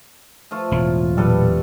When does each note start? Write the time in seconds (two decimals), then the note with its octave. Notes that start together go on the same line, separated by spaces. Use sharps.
0.51 F3 A3 F4
0.72 E1 A2
1.17 A#2 F#3 G3 A4 B4